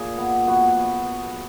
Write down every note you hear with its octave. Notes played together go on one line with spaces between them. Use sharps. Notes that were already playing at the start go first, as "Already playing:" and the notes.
Already playing: A#2 G#4
B3
B3 F#4